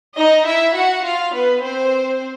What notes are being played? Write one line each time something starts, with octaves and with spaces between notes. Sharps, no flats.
D#4 D#5
E4 E5
F#4 F#5
F4 F5
B3 B4
C4 C5